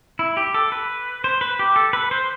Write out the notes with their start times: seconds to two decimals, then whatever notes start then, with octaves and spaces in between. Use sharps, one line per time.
0.19 E4
0.37 G4
0.54 A4
0.72 B4
1.24 C5
1.41 B4
1.59 G4
1.76 A4
1.93 B4
2.11 C5